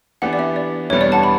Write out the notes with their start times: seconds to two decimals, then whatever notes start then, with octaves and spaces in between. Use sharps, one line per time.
0.22 E3 B3 D4 G4 F#5
0.33 D5
0.39 E5
0.56 D5
0.90 E2 B2 G3 B3 D4 C#5
1.01 D5
1.12 F#5 A5
1.23 B5